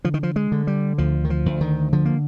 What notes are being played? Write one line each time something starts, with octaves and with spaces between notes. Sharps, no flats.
D3 F3
D#3
F3
G#3
D3
G3
D2 F3
D#3
F3
D2
D#3
D3 F3
A#3